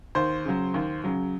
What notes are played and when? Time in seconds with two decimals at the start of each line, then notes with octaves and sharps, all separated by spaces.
0.15 D#2 C5
0.45 C#3 F#3
0.74 D#2
1.04 C#3 F#3